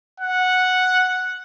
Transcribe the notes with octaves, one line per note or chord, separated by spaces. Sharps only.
F#5